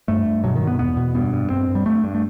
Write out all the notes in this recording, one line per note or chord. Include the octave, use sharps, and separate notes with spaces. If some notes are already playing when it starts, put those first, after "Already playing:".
G2 A3
G2
B2 F#3
D#3
B2
B3
E2 B3
B2
G2 B3
G2
G2 C4
G2
G3
G2 A3
G2
A3